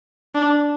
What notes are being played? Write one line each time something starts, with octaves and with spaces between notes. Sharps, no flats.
D4